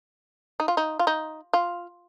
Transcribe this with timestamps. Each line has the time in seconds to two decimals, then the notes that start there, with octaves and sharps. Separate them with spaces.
0.60 D#4
0.68 F4
0.77 D#4
0.99 F4
1.07 D#4
1.53 F4